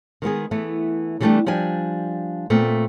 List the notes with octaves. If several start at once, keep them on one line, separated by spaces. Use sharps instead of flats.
D#3 G#3 B3 G#4
E3 A3 B3
D3 E3 G3 A3 B3 D4
F3 G3 D4 G#5
A#2 A3 B3 C4